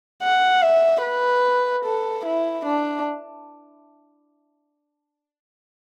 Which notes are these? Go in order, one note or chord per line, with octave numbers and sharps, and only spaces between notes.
F#5
E5
B4
A4
E4
D4